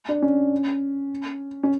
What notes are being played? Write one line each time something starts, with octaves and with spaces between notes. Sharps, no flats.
D4
C#4
C#4